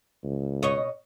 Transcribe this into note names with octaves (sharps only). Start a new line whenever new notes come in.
C#2
B2 C#5 D#5